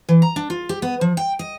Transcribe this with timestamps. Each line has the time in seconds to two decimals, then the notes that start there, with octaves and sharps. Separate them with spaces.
0.09 E3
0.22 A#5
0.36 D4
0.50 F4
0.69 G4
0.82 B3
1.01 F3
1.17 G5
1.39 D#5